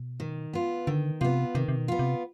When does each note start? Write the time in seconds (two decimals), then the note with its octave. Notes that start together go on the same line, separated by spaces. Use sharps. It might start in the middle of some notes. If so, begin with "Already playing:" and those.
Already playing: B2
0.20 D#3
0.53 B3 F4
0.87 D3 D#3
1.21 C3 B3 F4
1.55 C3 D#3
1.68 C3
1.77 B2
1.88 B3 F4
1.99 C3